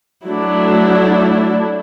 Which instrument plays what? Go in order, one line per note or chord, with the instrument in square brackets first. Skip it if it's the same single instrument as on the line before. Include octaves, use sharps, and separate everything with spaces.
[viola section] F#3 A3 D4 E4